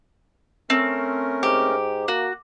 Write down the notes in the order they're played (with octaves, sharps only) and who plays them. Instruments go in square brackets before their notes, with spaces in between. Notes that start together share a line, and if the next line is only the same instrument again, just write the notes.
[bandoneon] A3 C#4 A#4 [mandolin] C4
[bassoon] G#2 [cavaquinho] G4
[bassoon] A#3 [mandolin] F#4